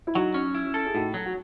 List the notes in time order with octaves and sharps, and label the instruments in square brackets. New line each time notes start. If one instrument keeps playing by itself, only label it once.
[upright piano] E4
[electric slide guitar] F#3 [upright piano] D#4 F#4
[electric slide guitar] C#4
E4
A4
[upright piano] G#4
[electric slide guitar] A2 [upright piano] D#4 F#4
[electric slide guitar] F#3
[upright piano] F#4